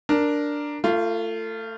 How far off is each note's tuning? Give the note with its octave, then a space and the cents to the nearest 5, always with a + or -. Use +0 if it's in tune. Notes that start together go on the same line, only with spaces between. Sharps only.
D4 +0 A#4 +0
A3 +25 F4 -15